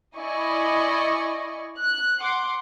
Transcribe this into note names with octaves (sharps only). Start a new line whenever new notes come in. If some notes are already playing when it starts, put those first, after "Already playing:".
E4 D5 D#5 G#5 C#6
F#6
F#5 C6 D6